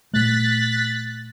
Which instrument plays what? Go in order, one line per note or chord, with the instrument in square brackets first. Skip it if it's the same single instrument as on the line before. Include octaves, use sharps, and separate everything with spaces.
[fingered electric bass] A#2 A3 [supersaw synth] F#6 A6 B6